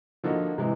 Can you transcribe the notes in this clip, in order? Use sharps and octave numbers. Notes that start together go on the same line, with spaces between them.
D3 F3 A#3 D#4 F#4
C3 E3 G#3